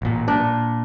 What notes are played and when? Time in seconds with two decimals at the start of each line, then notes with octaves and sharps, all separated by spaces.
0.02 A1 A#2
0.28 A#2 D4